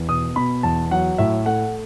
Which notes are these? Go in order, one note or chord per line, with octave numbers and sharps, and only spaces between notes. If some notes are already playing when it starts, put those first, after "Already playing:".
Already playing: E2
B2 D#6
B2 B5
E2 A5
F#3 F#5
A2 E5
A3 F#5